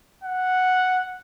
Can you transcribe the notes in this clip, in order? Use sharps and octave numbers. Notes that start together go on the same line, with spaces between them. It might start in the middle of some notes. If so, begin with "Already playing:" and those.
F#5